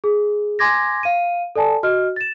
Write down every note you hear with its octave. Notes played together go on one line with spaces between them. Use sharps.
G#4
G#5 C6 D6 G#6 A#6
F5 D#7
A4 D5 G#5 A5
F#4 D#5 F6
A6 E7